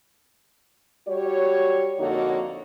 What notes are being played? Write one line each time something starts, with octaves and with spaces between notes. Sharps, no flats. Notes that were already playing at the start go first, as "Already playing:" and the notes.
G3 F#4 G4 C#5
F2 D3 A#3 D#4 F#4 C#5